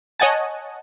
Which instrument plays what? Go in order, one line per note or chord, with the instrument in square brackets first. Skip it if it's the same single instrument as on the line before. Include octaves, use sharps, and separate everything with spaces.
[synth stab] C#5 D#5 F#5 G#5 A5